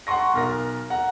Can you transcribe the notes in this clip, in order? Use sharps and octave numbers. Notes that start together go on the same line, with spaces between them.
F#5 A#5 C6 C#6 A#6
B1 A#4 A#6
F#5 A#5